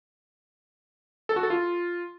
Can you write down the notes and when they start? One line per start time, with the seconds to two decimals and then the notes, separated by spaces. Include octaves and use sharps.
1.29 A4
1.36 F#4
1.43 A4
1.50 F4